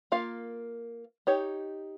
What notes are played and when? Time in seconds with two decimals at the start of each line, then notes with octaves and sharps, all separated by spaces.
0.12 A#3 F4 A#4 F5
1.27 D#4 G4 C#5